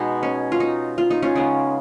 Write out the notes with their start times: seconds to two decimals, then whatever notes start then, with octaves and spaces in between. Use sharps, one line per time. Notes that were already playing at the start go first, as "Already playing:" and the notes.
Already playing: B2 G#3 B3 D#4
0.23 C#4
0.52 F4
0.60 D#4
0.98 F4
1.10 D#4
1.22 C#4 F4
1.35 C#3 G#3 B3 D#4